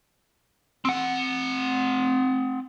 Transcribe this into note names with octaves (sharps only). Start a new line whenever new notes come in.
C4 F#5